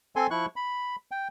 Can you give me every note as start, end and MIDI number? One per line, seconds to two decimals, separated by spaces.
0.16 0.27 60
0.16 0.27 69
0.16 0.27 80
0.16 0.27 84
0.31 0.46 53
0.31 0.46 64
0.31 0.46 85
0.31 0.46 90
0.56 0.96 83
1.11 1.28 79